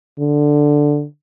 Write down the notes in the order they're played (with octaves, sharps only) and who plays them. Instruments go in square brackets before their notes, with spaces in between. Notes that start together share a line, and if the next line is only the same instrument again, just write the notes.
[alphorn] D3